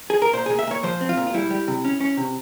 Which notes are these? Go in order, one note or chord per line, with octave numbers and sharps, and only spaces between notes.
G#4
A#4
A#2 C5
A#2 G#4
E5
A#2 C#5
F3 C5
C4
F4
A#2
F4
G3 E4
G3
C3
C#4
C#4
C3